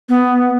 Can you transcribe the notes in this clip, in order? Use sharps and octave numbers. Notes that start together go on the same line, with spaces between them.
B3